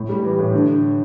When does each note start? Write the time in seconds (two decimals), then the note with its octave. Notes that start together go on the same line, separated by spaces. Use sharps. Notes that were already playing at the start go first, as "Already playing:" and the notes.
Already playing: A2
0.09 G3
0.24 E3
0.39 A2
0.54 D3